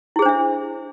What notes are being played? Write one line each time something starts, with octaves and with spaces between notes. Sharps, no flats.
D4 E4 G#4 C5 E5